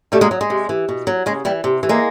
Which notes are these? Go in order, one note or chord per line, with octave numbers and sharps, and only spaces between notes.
B2 G3 A3
G#3 A#3
F#3
G#3
C3
E3
B2
F#3
C#3 G#3
E3 G3
C3
E3
G#3 A#3